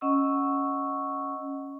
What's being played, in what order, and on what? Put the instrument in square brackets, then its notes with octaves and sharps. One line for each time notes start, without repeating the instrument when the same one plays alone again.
[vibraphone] C#4 D#5 F#5 C#6 E6